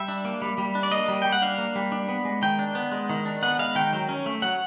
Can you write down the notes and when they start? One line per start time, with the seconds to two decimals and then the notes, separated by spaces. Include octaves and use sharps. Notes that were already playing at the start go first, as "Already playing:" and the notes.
Already playing: G3 E5
0.08 D4
0.25 A#3
0.42 G3
0.58 G3
0.75 D4
0.83 D5
0.92 A#3 D#5
1.08 G3
1.22 G3 G5
1.32 F#5
1.42 D4 F5
1.58 A#3
1.76 G3
1.92 D4
2.09 B3
2.25 G#3
2.42 D#3 G5
2.59 D4
2.75 B3
2.92 G#3
3.10 D#3
3.26 D4
3.43 B3 F#5
3.59 G#3 F5
3.75 D#3 G5
3.93 F#3
4.09 C#4
4.26 A3
4.42 F#3 F#5